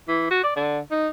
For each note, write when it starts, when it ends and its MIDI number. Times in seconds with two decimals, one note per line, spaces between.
0.08 0.26 52
0.31 0.42 66
0.44 0.52 74
0.56 0.79 50
0.91 1.08 63